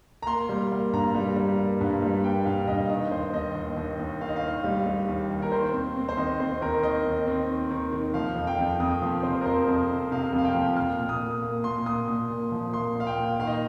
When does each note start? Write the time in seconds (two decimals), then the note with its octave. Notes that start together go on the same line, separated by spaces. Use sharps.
0.22 A#5
0.27 A#3 C6
0.49 G3
0.72 A#3
0.93 G2 A#5
1.15 G3
1.36 G3
1.59 A#3
1.81 G2
2.02 G3
2.24 A#3 G5
2.45 G2 F5
2.67 G2 D#5
2.89 D#3 D#5
3.11 D#2 C5
3.33 D#2 D#5
3.55 D#2
3.77 D#2
3.99 D#2
4.20 D#3 F5
4.29 D#5
4.36 F5
4.43 D#3
4.64 G3
4.86 G3
5.09 D#2
5.30 D#2
5.42 A#4
5.52 D#3 C5
5.73 C4
5.96 C4
6.09 C5
6.17 D#2 D#5
6.40 C4 C5
6.61 D#2 A#4
6.83 D#3 D#5
7.05 D#2
7.27 C4
7.50 D#3
7.71 D#3
7.93 D#3
8.14 F3 F5
8.36 F2
8.47 G5
8.59 F2
8.80 F2 D#6
9.02 F3
9.23 C3 C5
9.41 A#4
9.46 F2 C5
9.67 F2
9.90 C3
10.11 C3 F5
10.33 F2
10.38 F5
10.45 G5
10.55 F3
10.76 A#2 F6
10.99 A#2
11.09 D#6
11.20 A#2
11.43 A#3
11.64 A#2 C6
11.86 A#2 D#6
12.08 A#2
12.29 A#2
12.52 F3
12.73 A#3 C6
12.96 A#2 F5
13.07 G5
13.17 A#2
13.39 D#3 F5
13.47 D#5